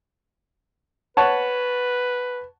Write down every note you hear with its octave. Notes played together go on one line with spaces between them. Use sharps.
B4 C#5 F#5 A5